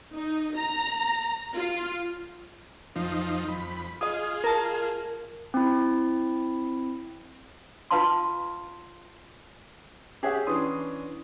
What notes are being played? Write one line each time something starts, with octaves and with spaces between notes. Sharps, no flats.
D#4
A#5
F4
F2 F3 D#4
F2 B5
F4 G#4 D#5 D#6
A#4 A5
C4 E4
F4 B4 F5 A5 C6
G4 G#4 C#5 E5 F#5
E3 C#4 D4 C6 D#6